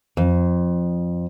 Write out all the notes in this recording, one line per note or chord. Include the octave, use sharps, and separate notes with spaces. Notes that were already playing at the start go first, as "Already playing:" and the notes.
F2